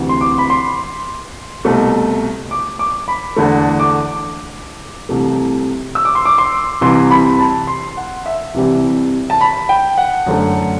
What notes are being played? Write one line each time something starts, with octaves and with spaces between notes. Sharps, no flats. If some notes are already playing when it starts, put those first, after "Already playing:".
Already playing: D2 C3 E3
C6
D6
B5
C6
C2 B2 A3
D6
D6
B5
E2 D3 A3
D6
C2 C3 E3 A3
E6
D6
C6
D6
C6
C2 C3 E3 C6
B5
A5
C6
F#5
E5
C2 C3 E3 G3
A5
B5
G5
F#5
F#2 D3 A3